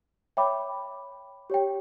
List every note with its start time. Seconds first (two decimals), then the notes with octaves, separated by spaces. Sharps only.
0.37 C#5 E5 G5 B5 D6
1.50 G4 C#5 G5